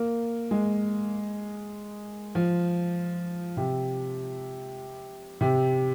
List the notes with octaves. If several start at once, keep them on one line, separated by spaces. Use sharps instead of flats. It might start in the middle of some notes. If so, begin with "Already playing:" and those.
Already playing: A#3
G#3
F3
C3
C3